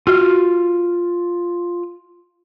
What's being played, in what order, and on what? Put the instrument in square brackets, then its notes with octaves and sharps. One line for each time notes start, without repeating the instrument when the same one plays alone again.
[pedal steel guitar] F4 F6 [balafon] F#4